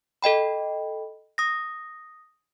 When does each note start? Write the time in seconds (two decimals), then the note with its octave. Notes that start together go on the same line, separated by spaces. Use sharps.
0.22 A4 D#5 G5 B5
1.38 D#6 A#6